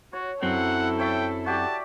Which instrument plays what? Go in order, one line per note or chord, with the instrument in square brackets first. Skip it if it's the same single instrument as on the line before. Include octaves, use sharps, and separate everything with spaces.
[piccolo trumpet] F#4 [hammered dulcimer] C#5
[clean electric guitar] F#2 F#3 C4 [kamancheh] E4 A4 [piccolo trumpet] F#5
[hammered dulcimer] C#5 E5 A5 [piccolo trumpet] G5
[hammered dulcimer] F#4 G4 D5 [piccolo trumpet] A5